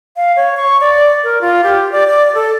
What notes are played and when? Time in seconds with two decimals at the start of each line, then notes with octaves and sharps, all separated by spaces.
0.16 F5
0.36 C#5
0.57 C#6
0.81 D5
1.24 A#4
1.41 F4
1.64 G4
1.92 D5
2.07 D5
2.34 A4